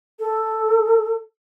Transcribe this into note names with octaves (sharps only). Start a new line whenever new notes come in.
A4